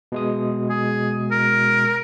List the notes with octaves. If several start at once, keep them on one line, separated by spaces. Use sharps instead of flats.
B2 G#3 D#6
G#4
A#4